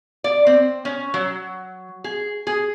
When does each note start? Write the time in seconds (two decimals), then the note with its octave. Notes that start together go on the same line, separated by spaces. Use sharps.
0.24 D5
0.47 C4
0.85 C#4
1.14 F#3
2.04 G#4
2.47 G#4